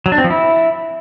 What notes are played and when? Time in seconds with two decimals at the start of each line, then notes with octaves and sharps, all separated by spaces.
0.06 F#3
0.12 D4
0.18 C4
0.24 F3
0.30 E4